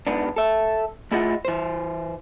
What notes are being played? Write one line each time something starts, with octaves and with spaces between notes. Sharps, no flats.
G#2 B3 D4
A4 E5
A3 E4 F4 G#4 D#5 F#5
E3 C5